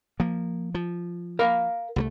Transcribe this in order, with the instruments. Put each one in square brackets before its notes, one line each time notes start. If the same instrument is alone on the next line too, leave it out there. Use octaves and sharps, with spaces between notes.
[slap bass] F3 A#3
F3
[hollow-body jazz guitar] A#4 F5 B5
[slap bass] C2 F#3 A3